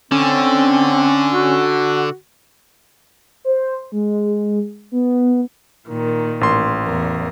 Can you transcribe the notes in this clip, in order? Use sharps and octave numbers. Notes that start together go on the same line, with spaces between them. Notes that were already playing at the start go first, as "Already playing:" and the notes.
D3 C4 C#4
F#4
C5
G#3
B3
A#2 D#3
A1 C6
E2 A#4